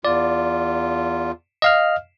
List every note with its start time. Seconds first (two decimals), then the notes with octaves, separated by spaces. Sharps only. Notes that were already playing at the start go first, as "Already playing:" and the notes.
0.05 E2 F4 D5
1.62 D#5 F5 F6